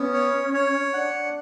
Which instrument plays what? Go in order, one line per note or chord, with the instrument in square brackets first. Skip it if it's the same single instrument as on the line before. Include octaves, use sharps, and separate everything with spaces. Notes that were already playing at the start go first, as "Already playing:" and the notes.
Already playing: [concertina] B3 [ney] C#4
[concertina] C#5
C#5
[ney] D4 [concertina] F#5